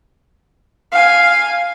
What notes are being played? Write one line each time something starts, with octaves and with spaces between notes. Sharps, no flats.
F5 G#5